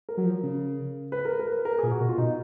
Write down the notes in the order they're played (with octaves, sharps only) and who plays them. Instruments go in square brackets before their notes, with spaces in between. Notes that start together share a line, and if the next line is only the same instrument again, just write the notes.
[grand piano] A#4
[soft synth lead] F#3
F3
C#3
[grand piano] B4
A#4
A#4
B4
A#4
[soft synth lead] A#2 [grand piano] G#4
[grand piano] F#4
[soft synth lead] B2
[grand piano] F4
[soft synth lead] B2 [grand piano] D#4